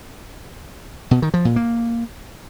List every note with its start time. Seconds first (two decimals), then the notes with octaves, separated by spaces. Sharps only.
1.11 B2
1.22 D#3
1.34 F3
1.45 A#2
1.56 A#3